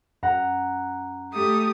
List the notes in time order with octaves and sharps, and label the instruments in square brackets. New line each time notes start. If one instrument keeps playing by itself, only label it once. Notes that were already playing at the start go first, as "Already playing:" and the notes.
[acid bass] F#2 [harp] F#5 A#5
[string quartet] A3 [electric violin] G4 D#6